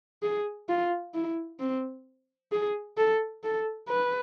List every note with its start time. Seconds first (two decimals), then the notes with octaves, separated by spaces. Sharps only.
0.23 G#4
0.69 F4
1.14 E4
1.60 C4
2.52 G#4
2.98 A4
3.44 A4
3.89 B4